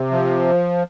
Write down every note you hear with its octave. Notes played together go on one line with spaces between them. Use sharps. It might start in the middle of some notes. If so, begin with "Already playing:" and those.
Already playing: C3
F3